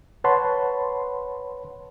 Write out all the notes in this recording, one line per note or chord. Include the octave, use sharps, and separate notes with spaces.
B4 C#5 F#5 A5 B5 C6